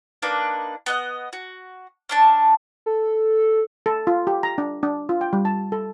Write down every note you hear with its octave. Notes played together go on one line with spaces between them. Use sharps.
A#3 D4 D#4 B4
B3 D#5 F#6
F#4
C#4 D4 A5
A4
A4
F4
G4
A#5
D4
D4
F4
G5
G3
A5
A4